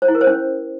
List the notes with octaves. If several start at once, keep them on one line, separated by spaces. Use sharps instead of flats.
C5
E4
A#4
C5
C#4